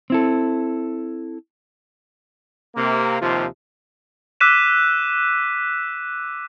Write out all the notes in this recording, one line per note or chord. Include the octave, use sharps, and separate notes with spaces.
C4 E4 A4
C3 A#3
D#2 C3 F3 F4
D6 E6 F#6 B6 D#7 E7